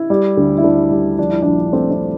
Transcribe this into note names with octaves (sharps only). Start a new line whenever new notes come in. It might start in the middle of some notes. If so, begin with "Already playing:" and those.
Already playing: E4
G3
D2
E4
D2 D4
G3
F3 D4
E4
A#1 D4
A3 C4
C4